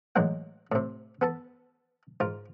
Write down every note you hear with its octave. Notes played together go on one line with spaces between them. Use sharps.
A1 F#3 G#3 A#3 F#5
A2 C3
B3 A4 A5
G#2 F4 A#4